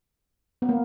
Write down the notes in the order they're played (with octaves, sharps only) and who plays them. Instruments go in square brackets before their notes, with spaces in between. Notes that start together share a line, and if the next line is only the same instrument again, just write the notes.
[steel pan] B3
A#3